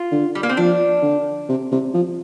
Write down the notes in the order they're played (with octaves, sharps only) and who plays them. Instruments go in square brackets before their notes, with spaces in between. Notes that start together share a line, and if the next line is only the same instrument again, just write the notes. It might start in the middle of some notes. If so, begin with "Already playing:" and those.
Already playing: [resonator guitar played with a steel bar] F4
[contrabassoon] D3
[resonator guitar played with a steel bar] G3
A#3
C4
[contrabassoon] F3 [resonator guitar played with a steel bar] D4
[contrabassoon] D3
C3
C3
F3